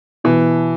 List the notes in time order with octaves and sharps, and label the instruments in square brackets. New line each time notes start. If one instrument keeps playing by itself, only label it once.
[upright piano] B2 [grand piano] E3